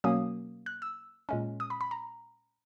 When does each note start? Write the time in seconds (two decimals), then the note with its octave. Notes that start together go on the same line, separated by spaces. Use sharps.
0.04 B2 F#3 A#3 C#4 D#6
0.66 F#6
0.82 E6
1.29 A#2 G#3 C#4
1.60 D#6
1.70 B5
1.81 B5
1.91 A#5